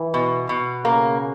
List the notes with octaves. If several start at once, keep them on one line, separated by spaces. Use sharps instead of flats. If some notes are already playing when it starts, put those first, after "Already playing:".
Already playing: E3
B2
B2
C#3 A#3